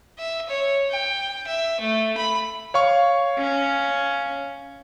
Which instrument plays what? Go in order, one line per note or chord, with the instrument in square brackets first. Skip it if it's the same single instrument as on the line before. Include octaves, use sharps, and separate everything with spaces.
[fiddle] E5
C#5
G5
E5
A3
B5
[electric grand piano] C#5 F5 C#6
[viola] C#4